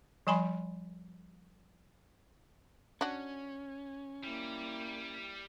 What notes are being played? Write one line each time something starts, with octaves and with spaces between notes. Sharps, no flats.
F3 G3 G#5 B5 C6
C#4 D4 F#4
G3 A#3 E4